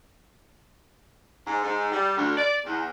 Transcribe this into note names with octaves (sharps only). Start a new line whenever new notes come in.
G#2
G#2
G3
D2
D5
E2